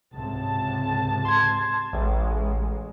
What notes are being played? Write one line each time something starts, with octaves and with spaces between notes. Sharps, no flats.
C#2 G#2 C3 A5
C6 G#6
A1 G#3